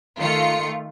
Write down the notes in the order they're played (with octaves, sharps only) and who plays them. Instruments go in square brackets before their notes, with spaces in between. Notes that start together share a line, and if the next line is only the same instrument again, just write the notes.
[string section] D#3 A3 F4 C#7